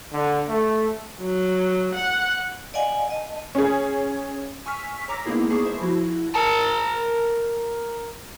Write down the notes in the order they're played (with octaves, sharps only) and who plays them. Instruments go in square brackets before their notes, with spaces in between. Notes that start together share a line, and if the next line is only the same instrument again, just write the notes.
[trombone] D3
A3
[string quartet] F#3
F#5
[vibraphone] D5 D#5 F5 F#5 G#5
D#5 A5
[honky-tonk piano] C#4 G#4
[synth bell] G#5 C#6 E6 F6 B6
C#5 A#5 D6 E6 F6 A#6
G#3 A#3 B3 D#4 E4 G#4
B3 G#4 A5 B5 C#6 D6
C5 E5
F3 E4 F#4
[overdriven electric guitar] A#4 A5